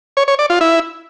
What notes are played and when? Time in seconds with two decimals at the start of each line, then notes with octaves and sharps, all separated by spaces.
0.17 C#5
0.28 C#5
0.39 D5
0.50 F4
0.61 E4